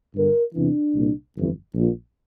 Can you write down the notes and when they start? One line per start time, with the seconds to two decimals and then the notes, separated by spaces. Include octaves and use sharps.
0.15 G1 G2 D3 A#4
0.54 E2 C3 E3 D4
0.95 C2 A#2
1.35 G1 F2 E3
1.75 A#1 A#2